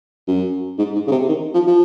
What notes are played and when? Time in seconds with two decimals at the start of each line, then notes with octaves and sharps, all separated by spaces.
0.28 F#2
0.78 G#2
0.95 G#2
1.08 C#3
1.12 C3
1.28 D#3
1.54 F3
1.67 F3